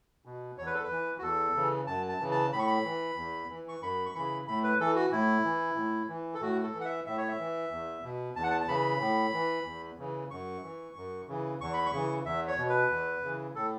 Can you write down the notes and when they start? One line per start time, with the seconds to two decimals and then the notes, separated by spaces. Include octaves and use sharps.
0.26 B2
0.58 E2 C#5
0.66 B4
0.75 A4
0.83 B4
0.91 E3
1.18 F#4
1.22 E2 A4
1.55 C#3 E3
1.87 F#2 A5
2.09 A5
2.21 C#3 E3
2.32 A5
2.53 A2 B5
2.59 C#6
2.67 B5
2.85 E3
3.18 E2
3.50 E3
3.69 C#6
3.82 F#2 B5
4.06 C#6
4.14 C#3 E3 B5
4.48 A2 B5
4.64 B4
4.80 E3 A4
4.95 F#4
5.12 A2 E4
5.44 E3
5.76 A2
6.09 E3
6.34 A4
6.41 A2 F#4
6.63 A4
6.74 E3
6.80 F#5
6.85 E5
7.06 A2 E5
7.18 C#5
7.28 E5
7.39 E3
7.72 E2
8.04 B2
8.36 E2 A5
8.43 F#5
8.50 A5
8.61 A5
8.68 C#3 E3 B5
9.01 A2
9.33 E3
9.66 E2
9.99 C#3 E3
10.31 F#2 C#6
10.64 E3
10.96 F#2
11.28 C#3 E3
11.61 E2 C#6
11.73 B5
11.86 C#6
11.93 C#3 E3
12.25 E2 E5
12.48 C#5
12.58 B2
12.69 B4
12.90 E2
13.23 C#3 E3
13.55 A2 A4